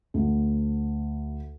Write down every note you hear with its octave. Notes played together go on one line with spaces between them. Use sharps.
D2